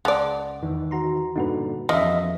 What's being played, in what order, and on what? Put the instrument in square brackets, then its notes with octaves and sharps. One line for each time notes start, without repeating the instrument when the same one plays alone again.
[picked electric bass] C#2 [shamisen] G#3 D5 [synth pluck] F#5 A5
[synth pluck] E2 [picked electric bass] D#3 E3
[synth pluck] F#4 A#5 C6
[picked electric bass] G2 A#2 D3 [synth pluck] D#4 F#4 B4
[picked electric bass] F2 E3 [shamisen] C#3 [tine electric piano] D#5 E5